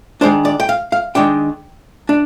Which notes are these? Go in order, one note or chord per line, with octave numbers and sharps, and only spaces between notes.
D#3 G#3 D4 C5
D5
G5
F5
F5
D#3 G#3 D4 G5
D4